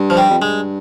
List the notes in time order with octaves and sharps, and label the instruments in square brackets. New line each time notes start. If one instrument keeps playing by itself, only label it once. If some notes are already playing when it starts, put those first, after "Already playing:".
Already playing: [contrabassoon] G2
[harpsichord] F3
G3
[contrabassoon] F2
[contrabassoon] G2 [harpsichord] G#3